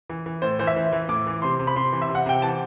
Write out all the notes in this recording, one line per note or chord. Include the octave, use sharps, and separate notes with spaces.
E3
E3
A2 C5
E3 C5
E5
E3
E3
A2 D6
E3
C3 C6
C3
B5
C3 C6
E3
E5
C3
F#5
C3 G5
E3 A5